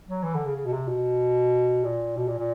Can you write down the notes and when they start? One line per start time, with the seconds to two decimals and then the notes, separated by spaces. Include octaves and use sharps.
0.08 F#3
0.23 E3
0.34 D3
0.45 C#3
0.55 C#3
0.65 B2
0.73 C3
0.88 B2
1.84 A#2
2.16 B2
2.28 A#2
2.38 A#2